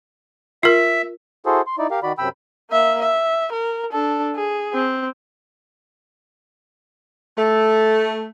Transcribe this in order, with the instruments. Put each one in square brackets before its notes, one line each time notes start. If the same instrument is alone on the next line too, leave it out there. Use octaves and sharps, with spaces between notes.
[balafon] F4 A#4 [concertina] E5
[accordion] E4 F#4 G#4 A4 C5
C6
D#4 E4 D5
G4 A#4 F5
D#3 F#4 D5 B5
F#2 C3 G5 B5 E6
[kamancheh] A#3 E5
E5
A#4
D4 A4
G#4
C4
[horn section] A3